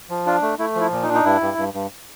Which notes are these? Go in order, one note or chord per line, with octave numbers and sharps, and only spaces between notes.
F3
D4 F4
A3
A3 E4
F3 E4
A#2
D#4
D4
D#4
G2 E4
G2
G2
G2